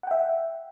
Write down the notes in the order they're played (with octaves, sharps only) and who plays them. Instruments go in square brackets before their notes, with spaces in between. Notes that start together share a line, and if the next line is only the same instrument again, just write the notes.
[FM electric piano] F#5
G5
E5